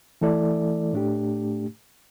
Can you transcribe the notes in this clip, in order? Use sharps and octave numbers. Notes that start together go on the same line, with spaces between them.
E3 A3 E4 A4 D5
A2 A3 D4 G4